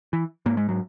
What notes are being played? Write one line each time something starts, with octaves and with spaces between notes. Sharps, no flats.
E3
G#2 A#3
G#3
F#3